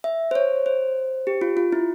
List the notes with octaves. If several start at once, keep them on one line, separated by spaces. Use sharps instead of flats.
E5
C5
C#5
C5
G4
F4
F4
E4